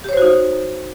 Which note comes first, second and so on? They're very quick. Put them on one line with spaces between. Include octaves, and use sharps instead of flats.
G4 C#5 C5 F#4 D#4